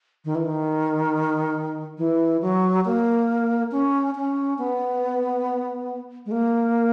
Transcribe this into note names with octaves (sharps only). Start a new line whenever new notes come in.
D#3
E3
D#3
E3
F#3
A#3
C#4
C#4
B3
G#3
A#3